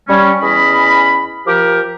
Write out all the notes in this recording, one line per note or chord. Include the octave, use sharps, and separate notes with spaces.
G3 C#4
E2 C#4 D#5 B5
F3 G4 A#4